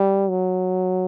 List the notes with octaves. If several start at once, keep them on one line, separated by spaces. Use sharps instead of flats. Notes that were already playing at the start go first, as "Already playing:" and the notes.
Already playing: G3
F#3